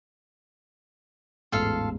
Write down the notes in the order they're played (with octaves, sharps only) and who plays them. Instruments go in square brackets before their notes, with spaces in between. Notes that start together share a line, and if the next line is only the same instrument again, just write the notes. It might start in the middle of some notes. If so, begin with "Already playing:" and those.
[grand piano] A1 E2 G#2 [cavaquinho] F4 A4 F5